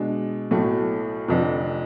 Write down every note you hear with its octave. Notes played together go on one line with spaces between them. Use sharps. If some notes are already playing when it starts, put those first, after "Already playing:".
Already playing: B2 G#3 D4
B1 A2 F#3 A3
F1 F2 D3